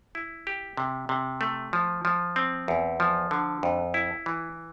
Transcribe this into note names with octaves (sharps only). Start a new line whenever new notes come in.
E4
G4
C3
C3
A3
F3
F3
C4
E2
F3
D3
F2
E4
E3